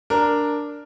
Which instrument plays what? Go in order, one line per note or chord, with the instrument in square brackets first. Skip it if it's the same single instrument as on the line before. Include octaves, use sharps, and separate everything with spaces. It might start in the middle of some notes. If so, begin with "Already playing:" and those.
[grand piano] D4 A#4